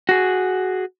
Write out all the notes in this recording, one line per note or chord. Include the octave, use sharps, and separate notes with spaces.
F#4 G#4